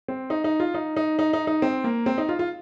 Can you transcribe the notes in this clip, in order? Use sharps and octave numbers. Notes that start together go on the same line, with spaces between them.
C4
D#4
D#4
F4
D#4
D#4
D#4
D#4
D#4
C4
A#3
C4
D#4
F4
F4